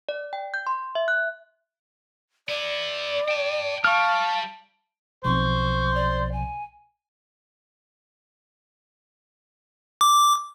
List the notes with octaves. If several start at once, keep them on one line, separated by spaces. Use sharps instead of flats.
D5
G5
G6
C6
E5
F#6
B3 E4 D5
G5 A5
G3 F5 A5 C#6 F6
B1 B2 F3 C4 C5 C#6
D5
G#5
D6